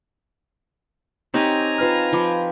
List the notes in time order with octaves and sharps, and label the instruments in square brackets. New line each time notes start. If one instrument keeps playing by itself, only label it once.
[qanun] C4 D#4 G4 [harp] A#4 C#5 [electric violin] G#5 A#5
[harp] F4 B4 F6
[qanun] F3 [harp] G5 B5 D6